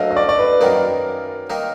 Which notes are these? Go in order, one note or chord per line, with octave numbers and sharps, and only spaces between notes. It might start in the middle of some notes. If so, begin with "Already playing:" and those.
Already playing: D2 D3 F#3 A#3 D4 D#5 F5
D#5
D5
D5
B4
F#2 D#3 A#3 D#4 A#4
D#3 A#3 D#4